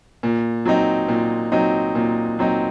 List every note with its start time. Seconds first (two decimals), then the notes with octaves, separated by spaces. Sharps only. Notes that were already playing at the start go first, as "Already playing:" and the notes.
0.23 A#2
0.65 F#3 C4 D#4
1.08 A#2
1.52 F#3 C4 D#4
1.95 A#2
2.39 F#3 C4 D#4